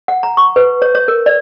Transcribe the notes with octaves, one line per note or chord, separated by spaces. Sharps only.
F#5
A#5
C#6
B4
C#5
C#5
A#4
D5